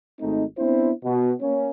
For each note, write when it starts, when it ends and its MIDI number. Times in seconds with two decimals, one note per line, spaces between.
0.19 0.43 32
0.19 0.43 57
0.19 0.43 60
0.19 0.43 63
0.57 0.90 59
0.57 0.90 60
0.57 0.90 62
0.57 0.90 64
0.57 0.90 72
1.03 1.32 47
1.40 1.70 58
1.40 1.70 61